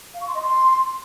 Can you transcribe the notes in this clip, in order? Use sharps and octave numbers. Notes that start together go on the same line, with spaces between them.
F5
C#6
C6
D#5
C6